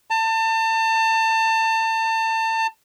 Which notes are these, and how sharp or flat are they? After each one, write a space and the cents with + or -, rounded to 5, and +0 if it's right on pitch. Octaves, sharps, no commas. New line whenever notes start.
A5 +30